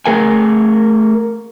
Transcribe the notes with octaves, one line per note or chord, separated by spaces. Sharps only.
A3 G#4 A#4 F#5 G#5